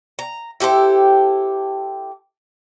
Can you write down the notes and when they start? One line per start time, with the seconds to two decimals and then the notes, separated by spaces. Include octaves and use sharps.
0.19 A#5
0.60 E4 G4 A4 C5